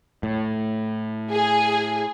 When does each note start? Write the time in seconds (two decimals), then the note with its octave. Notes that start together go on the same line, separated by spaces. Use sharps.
0.23 A2
1.31 G#4